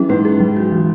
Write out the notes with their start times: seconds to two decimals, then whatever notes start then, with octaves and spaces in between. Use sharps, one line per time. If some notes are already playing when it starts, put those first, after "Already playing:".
Already playing: E3 F#3 C#4 G#4
0.09 G#2 B4
0.25 G#4
0.40 F#3
0.56 F#4
0.72 E3